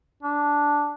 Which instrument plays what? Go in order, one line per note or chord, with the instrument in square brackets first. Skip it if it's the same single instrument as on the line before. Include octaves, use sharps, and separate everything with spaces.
[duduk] D4